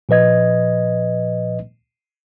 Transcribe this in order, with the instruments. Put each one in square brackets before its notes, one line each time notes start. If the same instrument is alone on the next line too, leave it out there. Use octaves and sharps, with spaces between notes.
[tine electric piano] A#2 F3 B4 D#5 G#6